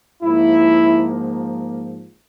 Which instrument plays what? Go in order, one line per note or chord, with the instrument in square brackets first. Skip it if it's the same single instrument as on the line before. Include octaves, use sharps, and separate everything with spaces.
[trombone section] G#2 F3 A#3 E4